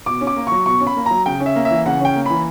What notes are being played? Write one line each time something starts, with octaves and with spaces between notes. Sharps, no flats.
B2 D6
C#4
D6
A#3
F#3 C#6
B2 C#6
C#4
B5
A#3
F#3 A#5
C#3 G5
C#4
E5
A#3
E5
E3
C#3 F#5
C#4 G5
A#3
E3 B5